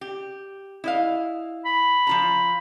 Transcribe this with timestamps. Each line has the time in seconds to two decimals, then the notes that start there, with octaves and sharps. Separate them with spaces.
0.01 G4
0.84 E4 D#5 F5
1.65 B5
2.07 F3 F4 A#5